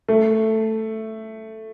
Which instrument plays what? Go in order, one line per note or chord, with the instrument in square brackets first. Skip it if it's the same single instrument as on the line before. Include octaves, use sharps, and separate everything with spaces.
[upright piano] A3